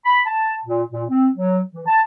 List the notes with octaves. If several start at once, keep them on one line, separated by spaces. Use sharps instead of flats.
B5
A5
A#2
A#2
C4
F#3
E3
A5